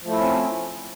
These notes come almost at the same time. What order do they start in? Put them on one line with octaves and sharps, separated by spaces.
F3 A3 E4 C#4 C4